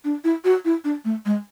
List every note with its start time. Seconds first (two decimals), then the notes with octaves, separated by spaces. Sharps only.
0.04 D4
0.24 E4
0.45 F#4
0.65 E4
0.84 D4
1.05 A3
1.26 G#3